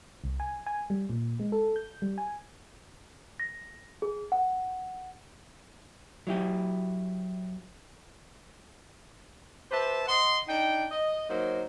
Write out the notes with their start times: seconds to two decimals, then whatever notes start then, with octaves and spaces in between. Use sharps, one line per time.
0.24 C2
0.40 G#5
0.66 G#5
0.90 G3
1.10 A#2
1.40 G#3
1.52 A4
1.76 G6
2.02 G3
2.18 G#5
3.40 A#6
4.02 G#4
4.32 F#5
6.27 F#3 E4 G4
9.70 G4 B4 C5 E5 A5
10.07 D#5 F#5 C6
10.48 D4 D#4 G5
10.91 D#5
11.29 F#3 A#3 D#4 C5